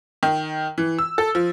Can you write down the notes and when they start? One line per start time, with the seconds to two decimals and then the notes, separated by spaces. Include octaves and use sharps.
0.23 D#3
0.78 E3
0.99 E6
1.18 A4
1.35 F3